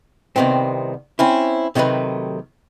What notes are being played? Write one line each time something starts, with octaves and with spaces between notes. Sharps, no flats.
C2 C3 D#3 B3 C4
C4 C#4 E4
C3 D#3 F#3 A3 B4